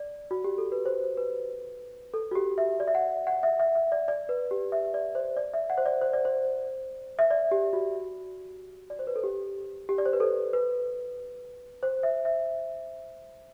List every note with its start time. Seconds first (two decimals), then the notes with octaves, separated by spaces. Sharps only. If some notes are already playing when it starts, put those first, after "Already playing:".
Already playing: D5
0.31 F#4
0.44 G4
0.58 A4
0.72 B4
0.86 C5
1.17 B4
2.14 A4
2.31 F#4
2.35 G4
2.58 E5
2.80 D5
2.88 E5
2.95 F#5
3.27 F#5
3.43 E5
3.60 E5
3.75 E5
3.92 D5
4.08 D5
4.29 B4
4.51 G4
4.72 E5
4.94 D5
5.15 C5
5.36 D5
5.53 E5
5.70 F#5
5.78 C5
5.86 D5
6.01 C5
6.13 D5
6.25 C5
7.19 E5
7.31 D5
7.51 G4
7.73 F#4
8.90 D5
8.99 C5
9.07 B4
9.16 A4
9.23 G4
9.89 G4
9.98 D5
10.06 C5
10.13 B4
10.20 A4
10.53 B4
11.83 C5
12.03 E5
12.25 E5